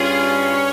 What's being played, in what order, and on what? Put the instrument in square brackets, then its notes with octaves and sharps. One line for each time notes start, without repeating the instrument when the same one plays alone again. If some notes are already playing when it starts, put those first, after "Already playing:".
Already playing: [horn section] G2 G3 C#4 [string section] F4 G#4
[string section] C#5